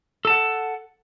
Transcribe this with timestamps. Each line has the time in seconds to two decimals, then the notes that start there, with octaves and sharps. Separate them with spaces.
0.25 A4
0.27 A5
0.30 F#5